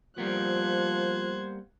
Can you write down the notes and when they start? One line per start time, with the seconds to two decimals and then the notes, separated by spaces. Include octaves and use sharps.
0.18 F3 G3 A#3 B3 C5 F#6 G#6